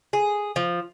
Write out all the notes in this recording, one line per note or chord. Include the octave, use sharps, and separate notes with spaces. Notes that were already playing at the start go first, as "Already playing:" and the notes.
G#4
F3